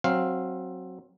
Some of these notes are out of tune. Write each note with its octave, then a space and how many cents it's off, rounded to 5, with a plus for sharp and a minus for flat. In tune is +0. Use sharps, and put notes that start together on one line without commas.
F#3 +0 C4 +15 F5 +0